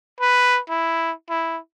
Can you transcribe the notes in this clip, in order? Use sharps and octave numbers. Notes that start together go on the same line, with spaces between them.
B4
E4
E4